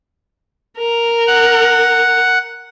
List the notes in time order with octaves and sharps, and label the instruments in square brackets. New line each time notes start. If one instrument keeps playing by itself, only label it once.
[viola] A#4
[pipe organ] F#5